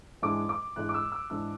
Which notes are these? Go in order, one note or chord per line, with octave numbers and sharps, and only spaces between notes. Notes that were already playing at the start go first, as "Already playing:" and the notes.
G#2 E3 G#3 D4 D6
D6
G#2 E3 G#3 D4 F#6
D6
E6
E6
G#2 E3 G#3 D4 E6